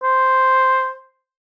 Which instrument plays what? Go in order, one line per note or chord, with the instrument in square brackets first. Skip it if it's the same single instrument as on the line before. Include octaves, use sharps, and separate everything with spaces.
[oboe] C5